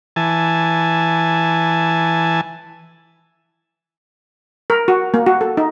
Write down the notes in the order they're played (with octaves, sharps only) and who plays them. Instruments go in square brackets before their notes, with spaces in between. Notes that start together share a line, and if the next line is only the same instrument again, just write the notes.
[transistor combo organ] E3 G#5 A5
[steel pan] A#4
F#4
A#3
F#4
A4
D#4